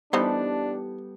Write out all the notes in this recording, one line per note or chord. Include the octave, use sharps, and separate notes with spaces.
E3 G3 B3 D4 D#4 G4 A4 C5